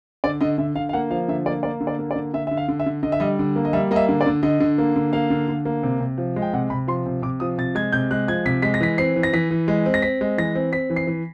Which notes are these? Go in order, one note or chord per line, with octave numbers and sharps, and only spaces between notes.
D3 D5
D3 D#5
D3 E5
D3 F5
F5
A#3 F#5
F3 F5
D3 E5
A#3 D5
A#3 D5
D3
D5
A#3
D5
D3
D3 E5
D3 E5
F5
D3
E5
D3
D3 D#5
E5
G3 D#5
D3
A#3
D#5
G3 E5
A#3 D#5
E5
D3
D5
D3
D3 D#5
D3
A#3
D3
A#3 F5
D3
D3
A#3
C3
C3
F3
G#3
G5
C3 F#5
C3 B5
F3 C6
C3
C3 D6
F3 D#6
C3 A6
G#3 G#6
C3 G6
G#3 F#6
F3 G#6
C3 B6
G#3 B6
A#6
E3 B6
C4 C7
E3
A#6
E3 B6
E3
G#3
C4
A#6
C4 B6
G#3
E3 A#6
C4
C4 B6
E3
C7
E3